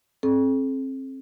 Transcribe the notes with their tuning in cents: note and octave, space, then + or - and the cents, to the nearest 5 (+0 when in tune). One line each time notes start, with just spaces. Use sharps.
C4 +25 A4 -45